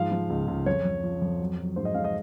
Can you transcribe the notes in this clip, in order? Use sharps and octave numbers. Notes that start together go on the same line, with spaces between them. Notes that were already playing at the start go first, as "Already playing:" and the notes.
Already playing: G#2 F3 F5
F3
C#2
C#2
F2 C#5
F2
F3
F2
F#3
F#3
G#2 C5
D#5
G#2 F5
D#5